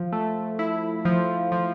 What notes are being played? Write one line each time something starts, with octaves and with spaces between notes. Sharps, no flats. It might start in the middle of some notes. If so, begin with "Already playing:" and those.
Already playing: F3
A3
E4
F3
F3